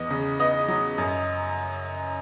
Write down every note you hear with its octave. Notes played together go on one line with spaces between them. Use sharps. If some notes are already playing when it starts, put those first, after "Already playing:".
Already playing: E2 B3 D#5 D#6
C#3
B3 D#5 D#6
F#3
F#2